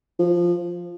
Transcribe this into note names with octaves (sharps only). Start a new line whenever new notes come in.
F3